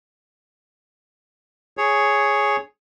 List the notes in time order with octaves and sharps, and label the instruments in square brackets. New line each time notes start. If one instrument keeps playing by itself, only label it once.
[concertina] G#4 C#5